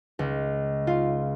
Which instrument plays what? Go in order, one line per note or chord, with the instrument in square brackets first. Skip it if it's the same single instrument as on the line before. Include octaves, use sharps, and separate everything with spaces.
[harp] C#2
F4